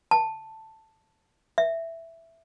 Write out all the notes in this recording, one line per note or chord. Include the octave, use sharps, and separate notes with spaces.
A5
E5